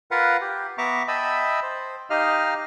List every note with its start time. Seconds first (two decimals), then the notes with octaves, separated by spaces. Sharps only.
0.11 F4 A#4 B4 F5 F#5
0.41 G4
0.78 B3 E5 A#5 C#6 D6
1.08 D#5 E5 G5 A5 B5 E6
1.63 C5
2.10 D#4 G4 D#5 F5 F6